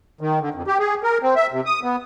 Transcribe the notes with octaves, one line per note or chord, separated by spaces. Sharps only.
D#3
D3
F2
G4
G#4
A#4
C4
E5
C3
D#6
B3